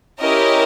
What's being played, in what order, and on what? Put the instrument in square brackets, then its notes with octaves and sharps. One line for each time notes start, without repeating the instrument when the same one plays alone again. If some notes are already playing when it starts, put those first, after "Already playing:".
[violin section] C#4 E4 G4 A#4 D#5